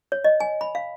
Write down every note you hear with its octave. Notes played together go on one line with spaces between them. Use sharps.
C#5
D#5
G#5
B5
F5